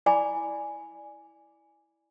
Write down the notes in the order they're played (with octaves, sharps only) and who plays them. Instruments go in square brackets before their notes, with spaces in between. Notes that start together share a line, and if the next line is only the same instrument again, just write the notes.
[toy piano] E4 D5 G#5 B5 D6